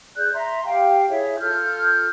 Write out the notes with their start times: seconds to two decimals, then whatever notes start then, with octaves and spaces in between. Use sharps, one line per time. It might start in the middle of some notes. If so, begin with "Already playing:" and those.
0.18 G#4 D5 F#6 G6
0.33 E5 A#5 C6
0.64 G4 F5 G5
1.09 E4 G#4 C#5 E5
1.40 F4 A4 F6 G6